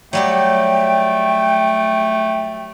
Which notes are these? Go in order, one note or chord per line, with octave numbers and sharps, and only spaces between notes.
F#3 G3 A3 G4 G5